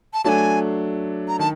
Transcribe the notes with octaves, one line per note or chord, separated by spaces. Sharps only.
A5
F#3 A3 D4 G#5 A5
A#5
D#3 A5